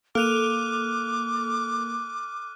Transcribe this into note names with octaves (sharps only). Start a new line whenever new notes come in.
A#3 A4 D6 F6 F#6 D#7 F7